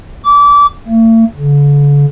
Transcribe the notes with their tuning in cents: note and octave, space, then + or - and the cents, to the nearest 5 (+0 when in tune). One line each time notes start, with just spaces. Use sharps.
D6 -25
A3 +45
D3 -40